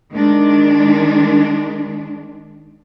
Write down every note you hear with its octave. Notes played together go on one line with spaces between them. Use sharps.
D#3 G#3 D4